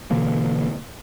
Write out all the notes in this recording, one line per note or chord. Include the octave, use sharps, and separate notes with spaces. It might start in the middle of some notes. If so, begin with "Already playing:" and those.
B2 D3 E3 A#3